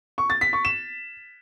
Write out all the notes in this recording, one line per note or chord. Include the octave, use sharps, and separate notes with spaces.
C#6
A6
B6
C#6
E7